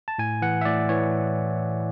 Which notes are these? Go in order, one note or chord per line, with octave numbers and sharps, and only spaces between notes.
A5
A2 G#5
E3 F#5
E5
A2 D5
E3 C#5